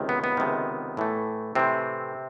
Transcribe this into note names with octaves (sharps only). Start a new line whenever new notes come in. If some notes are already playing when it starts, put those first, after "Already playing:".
Already playing: C#2 C3 D#3
B3
B3
C#2 C3 D#3
A2 E3 A3
A2 C3 E3 A3 C4